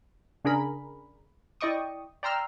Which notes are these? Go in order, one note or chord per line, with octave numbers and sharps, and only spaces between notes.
C#3 D4 G#4 A#4 B5
E4 D5 D#5 G5 C#6 D#6
D5 G5 A#5 C6 E6 F6